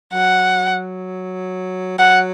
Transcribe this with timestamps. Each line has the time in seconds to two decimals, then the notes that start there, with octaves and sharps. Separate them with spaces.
0.13 F#3 F#5
1.99 F#3 F#5